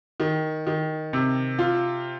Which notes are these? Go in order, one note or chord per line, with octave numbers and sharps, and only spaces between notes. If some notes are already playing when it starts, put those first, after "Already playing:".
D#3
D#3
C3
F4